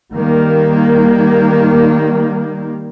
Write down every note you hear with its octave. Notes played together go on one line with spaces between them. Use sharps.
D#3 G3 A#3